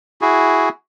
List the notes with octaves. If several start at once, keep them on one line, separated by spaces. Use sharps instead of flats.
E4 F#4 G#4